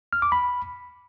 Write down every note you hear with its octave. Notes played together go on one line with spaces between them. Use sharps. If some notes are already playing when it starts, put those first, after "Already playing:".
F6
D6
B5